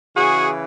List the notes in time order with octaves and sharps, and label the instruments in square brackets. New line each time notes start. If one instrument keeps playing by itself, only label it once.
[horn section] C#3 E3 F#4 G#4